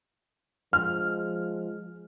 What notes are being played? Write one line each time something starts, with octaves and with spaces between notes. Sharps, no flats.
F3 G#3 F6